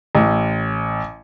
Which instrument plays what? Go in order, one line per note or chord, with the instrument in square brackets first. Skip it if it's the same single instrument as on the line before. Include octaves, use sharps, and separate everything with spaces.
[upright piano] A1